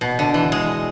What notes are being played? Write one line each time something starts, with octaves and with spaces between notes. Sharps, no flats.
B2
D3
E3
G#3